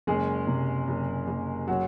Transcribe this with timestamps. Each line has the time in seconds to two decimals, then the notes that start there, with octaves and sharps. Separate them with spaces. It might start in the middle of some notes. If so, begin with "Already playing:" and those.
0.07 F#1 G#3 G#4
0.47 C3
0.88 F#1
1.27 F#1
1.68 F#3 F#4